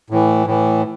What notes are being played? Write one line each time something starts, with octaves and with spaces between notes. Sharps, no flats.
A2 E3
A2 E3